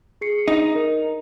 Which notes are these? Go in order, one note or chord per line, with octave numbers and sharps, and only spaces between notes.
G#4 C7 C#7
D#4
A#4